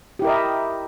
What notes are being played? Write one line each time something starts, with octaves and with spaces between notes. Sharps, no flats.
E4 G4 A#4 D#5 E5